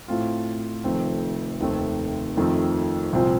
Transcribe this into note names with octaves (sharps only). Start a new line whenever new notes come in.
A2 A3 C4 F4
F1 F2 D#3 A3 C4
F1 D#2 D#3 A3 C4
F2 D#3 A3 C4
C2 A#2 F3 C4